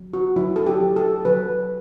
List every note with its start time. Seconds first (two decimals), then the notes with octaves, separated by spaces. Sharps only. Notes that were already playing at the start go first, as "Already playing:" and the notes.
Already playing: F#3
0.14 F#4
0.36 F#3 E4
0.56 A4
0.66 G4
0.80 F#3
0.96 A4
1.25 F#3 B4